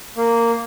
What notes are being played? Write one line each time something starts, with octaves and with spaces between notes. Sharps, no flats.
A#3